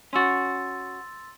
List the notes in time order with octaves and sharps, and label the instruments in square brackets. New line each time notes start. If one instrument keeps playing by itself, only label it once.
[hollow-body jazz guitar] C#4 F#4 [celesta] C6 E6 A6